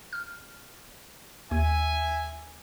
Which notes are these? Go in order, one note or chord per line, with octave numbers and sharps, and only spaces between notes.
F6
D#2 E5 G#5